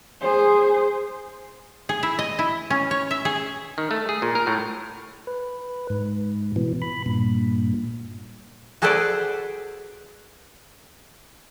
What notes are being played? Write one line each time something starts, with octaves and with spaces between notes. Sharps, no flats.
G#4 C5
G#4
E4
D#5
E4
C#4
C#5
E5
G#4
D#3
A3
G#4
A#2
A#4
A2
B4
G#2
B2 E3
B5
G2 A#2
F#4 G#4 A4 B4 C5 D5